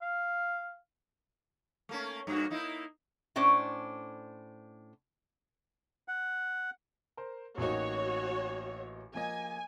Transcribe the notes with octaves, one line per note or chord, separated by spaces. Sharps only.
F5
A3 A#3 C#4
G2 A#3 F#4
A#3 D#4 E4
A2 C#4 D4 C5 D5
F#5
A#4 C5
A1 A#3 D#4 F#4 C#5
F3 A#3 D#5 G#5